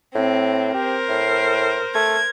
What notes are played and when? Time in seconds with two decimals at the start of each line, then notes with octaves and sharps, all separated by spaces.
0.15 A2 C4
0.74 G4 A#4 C5
1.09 A2 C7
1.95 A3 G#6